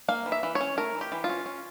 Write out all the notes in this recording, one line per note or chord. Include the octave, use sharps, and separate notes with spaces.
A#3 F5
E3
E5
E3
C#5
C#4
A3 A#4
E3
G4
E3
F4
C#4
C#4